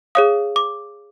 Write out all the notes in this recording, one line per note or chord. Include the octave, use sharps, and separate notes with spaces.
G#4 C#5 F5 D#6
D6